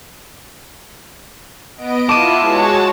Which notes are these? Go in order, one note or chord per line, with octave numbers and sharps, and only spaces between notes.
B3 D#5 D7
B3 E4 F4 A5 D6 D#7
G#3 F#4 C#5